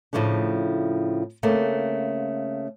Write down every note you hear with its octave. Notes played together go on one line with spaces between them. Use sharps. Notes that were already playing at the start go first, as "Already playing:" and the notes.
A2 C#3 F3 A3 D4
C#3 A3 A#3 C4